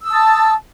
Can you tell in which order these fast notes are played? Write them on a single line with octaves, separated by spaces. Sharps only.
E6 D#6 A5